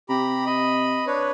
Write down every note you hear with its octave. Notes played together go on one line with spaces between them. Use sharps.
C3 G4 A#5 B5
D#5 B5
D4 B4 C#5